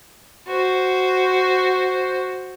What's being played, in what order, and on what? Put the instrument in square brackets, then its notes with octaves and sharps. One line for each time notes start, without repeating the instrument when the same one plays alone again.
[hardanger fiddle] F#4 C5